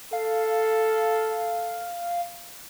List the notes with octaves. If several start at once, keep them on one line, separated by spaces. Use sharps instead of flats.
A4 F5